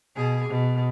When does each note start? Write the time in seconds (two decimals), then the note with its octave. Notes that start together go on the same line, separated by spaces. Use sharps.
0.15 B2 G#4
0.48 B2